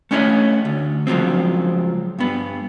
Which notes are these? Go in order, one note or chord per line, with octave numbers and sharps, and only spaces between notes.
A3 C#4 E4 C#5 D#5
D2
C#2 F3 F#3 C4
G2 B3